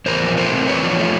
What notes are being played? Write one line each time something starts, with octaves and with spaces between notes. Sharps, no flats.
E2 A#4 C5
F3
A3 A#4 C5
C3
E2 B4 C#5
F3
A3